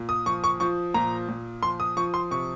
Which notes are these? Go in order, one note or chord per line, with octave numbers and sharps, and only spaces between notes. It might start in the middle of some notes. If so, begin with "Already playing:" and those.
Already playing: A#2
D#6
F3 C#6
C#6
F3 C#6
A#2 A#5
A#2
F3 C6
D#6
F3 C#6
C6
C3 C#6